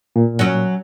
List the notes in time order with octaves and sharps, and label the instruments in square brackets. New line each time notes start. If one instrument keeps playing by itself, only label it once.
[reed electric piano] A#2
[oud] F#3 C#4